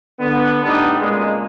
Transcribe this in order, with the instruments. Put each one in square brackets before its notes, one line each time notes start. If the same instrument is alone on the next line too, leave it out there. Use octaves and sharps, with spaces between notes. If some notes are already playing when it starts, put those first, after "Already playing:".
[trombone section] D3 B3
A2 G3 B3 D4 D#4
C#2 A#2 G#3